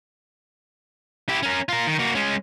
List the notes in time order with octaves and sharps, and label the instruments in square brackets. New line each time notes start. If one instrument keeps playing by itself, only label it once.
[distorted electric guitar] E4 G4
C#4 A#4
F4 A#4
D#3
A#3 F#4
G#3 C#4